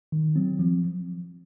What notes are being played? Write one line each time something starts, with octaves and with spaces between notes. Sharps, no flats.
D#3
F#3 C4
F3